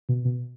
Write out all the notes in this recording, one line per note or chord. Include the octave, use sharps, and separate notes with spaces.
B2
B2